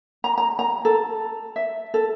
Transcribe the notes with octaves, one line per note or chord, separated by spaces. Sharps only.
A#5
A#5
A#5
A4
E5
A4